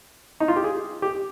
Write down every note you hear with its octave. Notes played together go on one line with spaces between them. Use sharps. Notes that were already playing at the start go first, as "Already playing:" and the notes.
D#4
F4
G4
G#4
G4